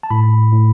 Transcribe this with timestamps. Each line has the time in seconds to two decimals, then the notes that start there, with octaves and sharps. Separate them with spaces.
0.03 A5
0.11 A2 B5
0.53 A2